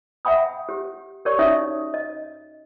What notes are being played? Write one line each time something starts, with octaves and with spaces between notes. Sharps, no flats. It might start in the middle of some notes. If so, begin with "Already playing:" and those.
E5 F#5 G5 B5 D#6
G4
G4 A#4 C#5 D5 C#6
C#4 D#4 F#4 C#5 E5 D#6
D#5